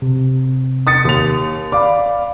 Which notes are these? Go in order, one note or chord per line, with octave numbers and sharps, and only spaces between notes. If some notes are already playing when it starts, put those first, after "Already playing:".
C3
D#6 A6 C#7
D#2 F7
D5 F5 B5 D6